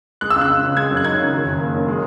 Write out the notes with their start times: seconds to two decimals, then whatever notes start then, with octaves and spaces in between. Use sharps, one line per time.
0.21 G#3 F#6
0.30 E6
0.36 C#2
0.41 F#6
0.49 C#2
0.63 C#3
0.76 G#3 G#6
0.91 F#2
0.97 F#6
1.04 D#4 G#6
1.19 C#3
1.33 D#3
1.45 F#1
1.60 A#3
1.74 F#2
1.88 G#3